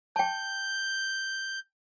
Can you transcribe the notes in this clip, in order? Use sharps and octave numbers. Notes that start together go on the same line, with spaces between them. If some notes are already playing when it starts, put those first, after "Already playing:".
G5 A5 G6